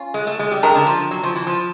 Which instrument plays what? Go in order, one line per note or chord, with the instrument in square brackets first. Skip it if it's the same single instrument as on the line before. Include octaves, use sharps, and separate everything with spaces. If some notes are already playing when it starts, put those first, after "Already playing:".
Already playing: [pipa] C#4 F4
[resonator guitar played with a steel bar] G#3
A3
G#3
G3
[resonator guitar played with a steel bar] G#3 [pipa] A3 D4 G4 A#4
[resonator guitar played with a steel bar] D3
F3
F#3
F3
E3
F3